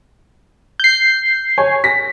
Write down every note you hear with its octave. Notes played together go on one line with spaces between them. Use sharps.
G6 C7
C#5 G#5
A#6 B6